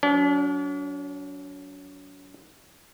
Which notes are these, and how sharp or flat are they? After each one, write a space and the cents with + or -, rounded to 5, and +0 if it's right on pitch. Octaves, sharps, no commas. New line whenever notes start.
F#3 +0 D4 -45